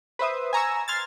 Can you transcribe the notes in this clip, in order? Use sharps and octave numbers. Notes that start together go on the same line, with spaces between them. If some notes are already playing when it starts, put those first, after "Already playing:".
B4 C5 E5 D#6
G#5 A#5 C#6 E6
C6 F6 G#6 A6